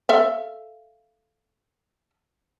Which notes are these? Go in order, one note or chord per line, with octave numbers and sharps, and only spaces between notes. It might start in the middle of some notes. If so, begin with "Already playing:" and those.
A4 E5 F5